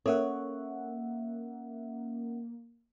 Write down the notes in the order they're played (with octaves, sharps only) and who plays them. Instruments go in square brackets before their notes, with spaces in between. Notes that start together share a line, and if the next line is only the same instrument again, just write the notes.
[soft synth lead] A#3 [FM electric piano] C#4 E5 F#5 [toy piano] A4 A#4 [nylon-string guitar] C#5